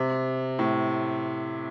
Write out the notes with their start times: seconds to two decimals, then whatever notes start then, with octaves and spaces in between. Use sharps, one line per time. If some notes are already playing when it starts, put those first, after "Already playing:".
Already playing: C3
0.59 A2